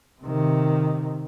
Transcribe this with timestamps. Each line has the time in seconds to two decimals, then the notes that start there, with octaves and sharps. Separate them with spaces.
0.22 C3 D#3